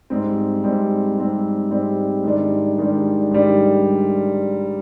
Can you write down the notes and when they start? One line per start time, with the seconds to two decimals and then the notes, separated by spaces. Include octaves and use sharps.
0.10 G#2 G3 C4
0.64 G#2 G3 C4
1.18 G#2 G3 C4
1.70 G#2 G3 C4
2.24 G#2 D#3 G3 D4
2.78 G#2 D#3 G3 D4
3.31 G#2 D#3 G3 D4